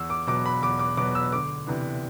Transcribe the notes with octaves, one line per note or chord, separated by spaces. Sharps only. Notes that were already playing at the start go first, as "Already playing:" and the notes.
Already playing: E2 E6
D6
B2 F#3 B3 D6
B5
E2 D6
D6
B2 F#3 B3 D6
E6
D2 D6
C3 E3 B3 D4